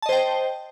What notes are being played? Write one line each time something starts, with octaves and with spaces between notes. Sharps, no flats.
C5 D#5 G5 A5